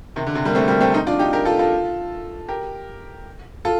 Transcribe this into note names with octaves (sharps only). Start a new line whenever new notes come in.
C3 D#3
D3
C3
G3 A#3
A3 C4
G3 A#3
A3 C4
C4 D#4
D4 F4
D#4 G4
G4 A#4
F4 A4
F4 A4
G4 A#4
F4 A4